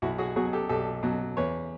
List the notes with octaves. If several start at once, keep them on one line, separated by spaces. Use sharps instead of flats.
B1 E4 F#4
F#4 G#4
B2 F#3 F#4 G#4
G4 A4
B1 G4 A4
B2 F#3
E2 B4 C#5